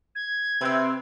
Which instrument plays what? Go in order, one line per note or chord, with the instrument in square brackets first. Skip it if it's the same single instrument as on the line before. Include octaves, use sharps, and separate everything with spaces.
[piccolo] G#6
[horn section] C3 C4 [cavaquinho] B4 E5